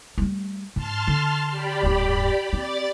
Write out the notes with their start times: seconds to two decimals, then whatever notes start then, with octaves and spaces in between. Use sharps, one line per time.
0.18 G3 A3
0.76 G#2 A5 C6 F6
1.08 D3
1.51 G4 D5 B5
1.83 D1 G2
2.53 C4 D5 A6